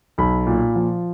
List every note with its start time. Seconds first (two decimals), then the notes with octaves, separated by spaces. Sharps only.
0.18 B1 B5
0.47 A#2
0.76 F3